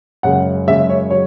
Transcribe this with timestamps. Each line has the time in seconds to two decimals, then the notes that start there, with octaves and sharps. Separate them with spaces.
0.23 F#2 C#3 G#3 F#5
0.67 F#2 C#3 G#3 E5
0.89 C#5
1.11 F#3 C#5